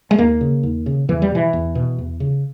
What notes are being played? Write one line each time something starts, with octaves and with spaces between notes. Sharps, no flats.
G#3
D#2 A#3
C#3
D#2
C#3
E2 E3
G3
B2 E3
E2
B2
E2
C#3